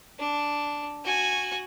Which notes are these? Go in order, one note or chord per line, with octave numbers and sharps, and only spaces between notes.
D4
F#4 G#5